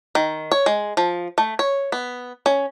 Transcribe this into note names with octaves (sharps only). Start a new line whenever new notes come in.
D#3
C#5
G#3
F3
A3
C#5
B3
C#4